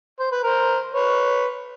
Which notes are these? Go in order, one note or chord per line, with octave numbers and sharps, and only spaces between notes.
C5
B4
A#4 C5
B4 C#5